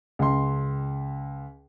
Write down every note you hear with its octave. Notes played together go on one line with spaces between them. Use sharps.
C#2 C6